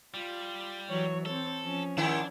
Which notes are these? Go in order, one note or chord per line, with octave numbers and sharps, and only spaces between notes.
G3 F4
E3 F#3 C#5
C4 A4 C#5
F3 C#4
G#2 D#3 D4 E4 A5